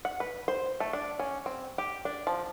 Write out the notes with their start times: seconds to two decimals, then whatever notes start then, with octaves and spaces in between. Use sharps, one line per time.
0.05 F#5
0.20 B4
0.48 C5
0.80 A3
0.93 D4
1.20 C#4
1.46 C4
1.78 G4
2.05 D4
2.27 F3